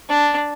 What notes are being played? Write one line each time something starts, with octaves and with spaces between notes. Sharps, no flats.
D4